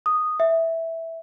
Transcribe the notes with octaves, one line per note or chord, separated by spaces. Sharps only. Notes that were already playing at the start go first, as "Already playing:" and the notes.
D#6
E5